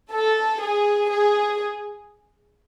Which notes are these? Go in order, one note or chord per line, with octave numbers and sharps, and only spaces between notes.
A4
G#4
G#4